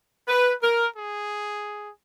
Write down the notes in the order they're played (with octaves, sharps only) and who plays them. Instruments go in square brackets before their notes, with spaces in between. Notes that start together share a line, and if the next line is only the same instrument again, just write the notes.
[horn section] B4
A#4
G#4